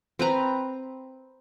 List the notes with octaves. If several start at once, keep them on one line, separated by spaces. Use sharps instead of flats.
C4 B4 A#5